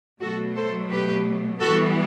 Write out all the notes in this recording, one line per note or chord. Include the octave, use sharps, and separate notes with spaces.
B2 F#3 A3 F#4 A4
A4 C5
G4 B4
E3 G3 B3 F#4 A4